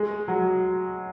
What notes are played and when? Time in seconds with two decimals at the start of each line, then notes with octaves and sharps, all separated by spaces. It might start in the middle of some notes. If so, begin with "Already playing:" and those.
Already playing: G#3
0.28 F#3